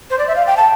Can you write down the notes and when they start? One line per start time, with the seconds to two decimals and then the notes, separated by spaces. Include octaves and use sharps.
0.10 C5
0.18 D5
0.28 E5
0.35 F5
0.47 G5
0.57 A5